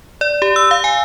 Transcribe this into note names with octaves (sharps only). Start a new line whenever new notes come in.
D5
G4
E6
F5
G#5